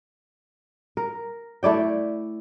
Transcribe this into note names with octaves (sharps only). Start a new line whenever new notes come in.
A#4
A3 E4 D5 G5